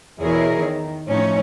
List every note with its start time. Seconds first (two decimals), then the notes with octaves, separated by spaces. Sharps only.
0.21 E2 B2 E4 G#4 A#4 C#5
0.62 D#3
1.08 A2 F3 C#4 D#4 C#5